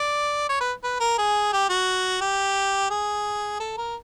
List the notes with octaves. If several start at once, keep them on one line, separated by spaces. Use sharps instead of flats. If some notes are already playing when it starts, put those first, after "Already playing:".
Already playing: D5
C#5
B4
B4
A#4
G#4
G4
F#4
G4
G#4
A4
A#4